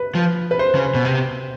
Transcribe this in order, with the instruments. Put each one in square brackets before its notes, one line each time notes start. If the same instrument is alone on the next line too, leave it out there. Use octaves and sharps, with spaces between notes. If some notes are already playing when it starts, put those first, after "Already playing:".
Already playing: [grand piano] B4
[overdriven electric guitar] F3
[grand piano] B4
C5
[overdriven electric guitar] C#3
B2
C3